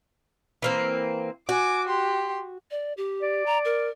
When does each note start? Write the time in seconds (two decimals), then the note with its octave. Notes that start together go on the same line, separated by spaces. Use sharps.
0.62 E3 A#3 C4
1.49 F#4 G#5 D6
1.87 G4 C6
2.71 D5
2.97 G4
3.22 D5
3.46 A#5
3.65 A#4